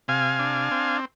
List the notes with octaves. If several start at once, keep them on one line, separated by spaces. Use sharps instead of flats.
C3 F5 G#5
D4
C4